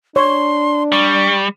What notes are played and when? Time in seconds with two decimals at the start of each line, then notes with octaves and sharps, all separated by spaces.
0.16 D4 C#5 C6
0.92 G3 C#6